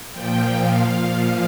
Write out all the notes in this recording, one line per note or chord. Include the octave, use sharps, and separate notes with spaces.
A#2 F3 G5
F5
A#2 F3